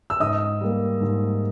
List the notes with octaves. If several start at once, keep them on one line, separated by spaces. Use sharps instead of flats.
E6
G#2 D#5 D#6
G3 A#3
G#2